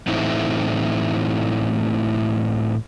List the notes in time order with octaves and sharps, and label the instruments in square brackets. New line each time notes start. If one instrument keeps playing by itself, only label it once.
[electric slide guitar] A2 E3 A3 C4 D#4 E4